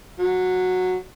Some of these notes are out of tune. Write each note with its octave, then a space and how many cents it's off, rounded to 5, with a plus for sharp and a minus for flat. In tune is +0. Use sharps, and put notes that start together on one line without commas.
F#3 -10